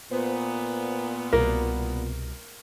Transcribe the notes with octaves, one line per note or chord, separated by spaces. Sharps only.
A#2 B3 C5
C2 B2 A#3